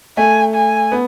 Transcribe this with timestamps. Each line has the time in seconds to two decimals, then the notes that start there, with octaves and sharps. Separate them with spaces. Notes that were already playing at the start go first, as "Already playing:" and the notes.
0.17 A3 G#5
0.55 G#5
0.92 B3